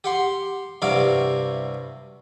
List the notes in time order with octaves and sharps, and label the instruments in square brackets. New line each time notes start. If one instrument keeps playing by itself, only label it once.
[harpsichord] G4 F#5 C6
G2 C3 E4 F#4 F5 D6